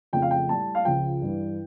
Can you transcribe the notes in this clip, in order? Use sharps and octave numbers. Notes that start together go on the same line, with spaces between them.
F2 C#3 F3 A3 G5
F5
G5
A2 G3 A5
F5
C#2 C#3 F3 G5
G2 E3 G3